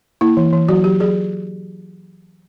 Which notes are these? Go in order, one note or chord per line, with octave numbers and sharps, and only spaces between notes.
A#3 E4
E3
E3
F#3 F#4
F#3 G4
F#3 G#4